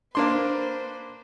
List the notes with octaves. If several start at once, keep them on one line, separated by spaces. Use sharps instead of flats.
A#3 D4 B4 C5 C6